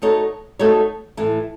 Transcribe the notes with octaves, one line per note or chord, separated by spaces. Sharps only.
A3 D#4 F#4 A4 C#5
A3 D#4 F#4 A4 C#5
A2 E3 A3